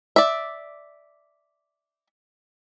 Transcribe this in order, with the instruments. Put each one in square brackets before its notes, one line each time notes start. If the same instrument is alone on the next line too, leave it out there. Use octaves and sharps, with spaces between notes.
[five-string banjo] D5 E5